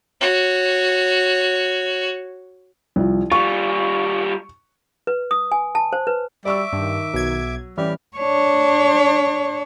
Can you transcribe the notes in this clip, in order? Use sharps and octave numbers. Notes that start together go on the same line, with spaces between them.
F#4 C#5
C2 F3
G3 F4 C#6
B4
D#6
G#5
A5
C5
B4
G3 D5 E5 C#6 D6 E6
G2 D#3
B1 F#3 G#6
A1 E3 G3 G4 F6
D4 C#5